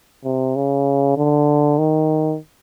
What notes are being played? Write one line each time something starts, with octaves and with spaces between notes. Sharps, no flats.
C3
C#3
D3
D#3